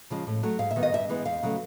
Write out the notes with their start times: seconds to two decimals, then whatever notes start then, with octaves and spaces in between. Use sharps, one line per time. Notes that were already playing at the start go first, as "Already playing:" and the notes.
0.10 C#3 F3 G#3
0.27 A2
0.43 F#3 A3
0.59 G#2 F5
0.71 E5
0.76 D#3 G3 B3
0.83 D#5
0.92 G2 E5
1.09 E3 G#3 B3
1.25 E2 F5
1.43 C#3 F#3 A3